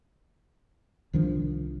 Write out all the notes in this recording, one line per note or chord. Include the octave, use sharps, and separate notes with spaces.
C2 D#3 F3 D4